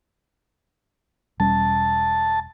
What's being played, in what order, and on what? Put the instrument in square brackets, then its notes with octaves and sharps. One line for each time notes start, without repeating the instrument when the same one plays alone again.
[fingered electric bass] E1 G3 C#4 [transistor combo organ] A5